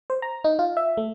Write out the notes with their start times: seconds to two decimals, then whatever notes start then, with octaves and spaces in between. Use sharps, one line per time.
0.10 C5
0.22 A#5
0.44 D#4
0.59 F4
0.77 E5
0.97 A3